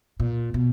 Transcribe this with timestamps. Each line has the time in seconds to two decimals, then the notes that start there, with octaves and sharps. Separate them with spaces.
0.20 A#2
0.54 B2